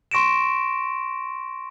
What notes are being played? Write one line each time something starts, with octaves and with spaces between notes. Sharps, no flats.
C6 C#6 A#6 D7 E7